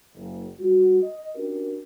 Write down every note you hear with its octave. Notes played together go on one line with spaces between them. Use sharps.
F#1
G3 F#4
D#5
C#4 D4 F#4 G4 A#4